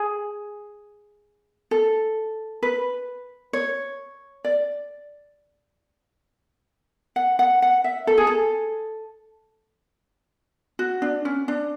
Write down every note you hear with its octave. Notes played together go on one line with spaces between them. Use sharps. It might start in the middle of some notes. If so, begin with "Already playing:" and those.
Already playing: G#4
A4
B4
C#5
D5
F#5
F#5
F#5
E5
A4
G#4
A4
F#4
D4
C#4
D4